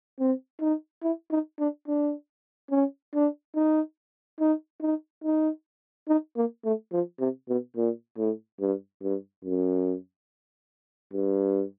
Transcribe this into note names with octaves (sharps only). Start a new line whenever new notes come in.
C4
D#4
E4
D#4
D4
D4
C#4
D4
D#4
D#4
D#4
D#4
D#4
A#3
A3
F3
C3
B2
A#2
A2
G2
G2
F#2
G2